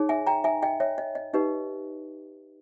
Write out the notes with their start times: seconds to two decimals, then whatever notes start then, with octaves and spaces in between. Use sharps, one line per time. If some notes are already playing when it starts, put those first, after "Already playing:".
Already playing: D#4 G#4 C#5
0.09 E5 G#5
0.27 G5 A#5
0.44 E5 G#5
0.63 D#5 G5
0.80 C#5 E5
0.98 D#5
1.15 D#5
1.33 D#4 G4 B4 D#5